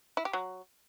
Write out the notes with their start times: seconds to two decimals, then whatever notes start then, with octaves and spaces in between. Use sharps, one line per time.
0.17 E4
0.25 G4
0.33 F#3